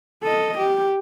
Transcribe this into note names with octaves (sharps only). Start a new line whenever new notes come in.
A4 D#5
G4